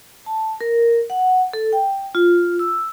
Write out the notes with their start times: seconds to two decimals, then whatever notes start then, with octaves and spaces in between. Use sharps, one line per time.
0.26 A5
0.61 A#4
1.10 F#5
1.53 A4
1.73 G5
2.15 F4
2.59 E6